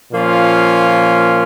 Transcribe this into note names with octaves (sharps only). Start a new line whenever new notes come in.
A#2 F3 A#3 C#4 F4